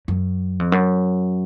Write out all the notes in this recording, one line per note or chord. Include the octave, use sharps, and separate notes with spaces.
F#2
F2
F#2